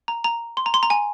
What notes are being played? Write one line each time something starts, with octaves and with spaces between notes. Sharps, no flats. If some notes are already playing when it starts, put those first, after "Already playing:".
A#5
A#5
C6
A#5
C6
A#5
G#5